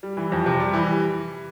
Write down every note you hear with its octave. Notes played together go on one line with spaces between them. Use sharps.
G3
E3
F2
C3
G3
E3